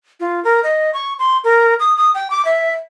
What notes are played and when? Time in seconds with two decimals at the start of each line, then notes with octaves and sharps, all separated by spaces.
0.20 F4
0.44 A#4
0.64 D#5
0.94 C#6
1.19 C6
1.44 A#4
1.80 D#6
1.97 D#6
2.15 G5
2.30 D6
2.45 E5